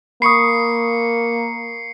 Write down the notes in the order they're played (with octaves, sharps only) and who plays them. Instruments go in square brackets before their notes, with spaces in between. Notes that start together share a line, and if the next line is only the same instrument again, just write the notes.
[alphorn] A#3 [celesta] B5 C#6 D#6 [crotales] C7 C#7